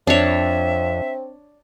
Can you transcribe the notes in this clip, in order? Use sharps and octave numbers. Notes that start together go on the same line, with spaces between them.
F2 C4 D4 C#5 E5